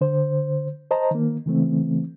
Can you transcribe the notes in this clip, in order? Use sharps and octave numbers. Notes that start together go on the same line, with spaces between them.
D3 C5
C5 D#5 A5 A#5
D#3 A#3
C#3 E3 A3 C4